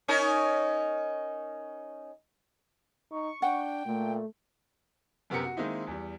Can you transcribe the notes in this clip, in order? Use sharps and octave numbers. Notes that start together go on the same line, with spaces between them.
C#4 D#4 A#4
D#4 C#6
D4 F#5 G5
A#2 A3
F#2 C3 B3 G4 A#4 C#7
F#4
D#3 G#3 A#3 C4 D#4 E4
E2 G3